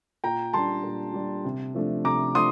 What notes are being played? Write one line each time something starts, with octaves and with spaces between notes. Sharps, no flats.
A#2 G5 A#5
G3 D4 A5 C6
A#2
G3 D4
C3
F3 A3 D4
C3 A#5 D6
F3 A3 D4 C6 D#6